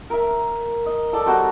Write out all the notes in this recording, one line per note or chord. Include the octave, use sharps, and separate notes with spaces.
A#4 E5
D#5
A4 D5 G5 A5
G3 C4 D#4 F#4